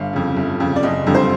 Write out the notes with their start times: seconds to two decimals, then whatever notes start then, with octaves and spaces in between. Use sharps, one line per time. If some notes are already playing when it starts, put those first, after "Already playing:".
Already playing: G1 F5
0.13 F2 C#3
0.36 G1
0.60 F2 C#3
0.76 D5
0.83 F#1 D#5
1.07 F2 D3 G3
1.15 C5